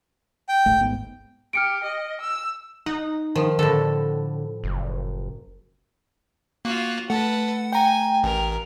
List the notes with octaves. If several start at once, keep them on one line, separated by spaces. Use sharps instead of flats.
G5
D1 G#1 A3
G#1 G#2 B3
G4 F6 C#7 D7
D#5
E6
D#4 F#5
D#3 F3
A2 D3 A4
F#1
A#3 F4 F#4
A3 A4 B4 F#5
G5 G#5 A#5
A1 A#4